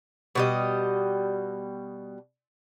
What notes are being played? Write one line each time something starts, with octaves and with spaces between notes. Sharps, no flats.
B2 G3 D#5